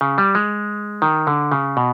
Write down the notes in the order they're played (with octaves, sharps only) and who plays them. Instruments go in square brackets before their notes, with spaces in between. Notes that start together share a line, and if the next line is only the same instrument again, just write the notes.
[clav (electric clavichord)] C#3
G3
G#3
D#3
D3
C#3
B2